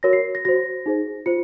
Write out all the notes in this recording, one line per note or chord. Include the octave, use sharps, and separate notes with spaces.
F#4 A#4 C#5 A#6
C7
A#6
F#4 C5 A#6
D#4 G#4 C5
F4 C5 C#7